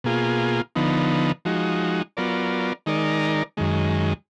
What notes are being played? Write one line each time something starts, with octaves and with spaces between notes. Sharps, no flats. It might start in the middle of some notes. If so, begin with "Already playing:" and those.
B2 A#3 F4 G#4
D3 F3 B3 D#4
F3 G#3 D#4 F#4
F#3 B3 F4 A#4 D5
D#3 G#3 D#4 A#4 D5
F#2 D#3 G#3